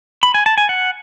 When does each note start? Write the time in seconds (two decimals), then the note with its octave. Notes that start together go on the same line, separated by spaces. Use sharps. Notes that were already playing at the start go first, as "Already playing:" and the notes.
0.23 B5
0.34 G#5
0.46 A5
0.58 G#5
0.69 F#5